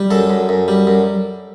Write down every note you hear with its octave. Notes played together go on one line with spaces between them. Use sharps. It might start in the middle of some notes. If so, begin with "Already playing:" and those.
Already playing: G3
F#2 A4
F#2
F#2
G3
F#2